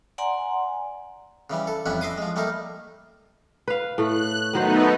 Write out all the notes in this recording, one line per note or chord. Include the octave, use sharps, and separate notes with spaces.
D5 F#5 G#5 A#5 C6
C#3 E3 G3
A4
A1 F2 G3 C#4 E4 F#5
D#5 E5 C6 D6 D#6
F3 G#3
G3 A3 A#3 D#4 A#4
B4 F5
A2 A3 F#6
D#3 F#3 A3 B3 D#4 C5